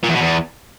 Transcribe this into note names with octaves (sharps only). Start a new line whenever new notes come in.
A#2
E2
B2
E2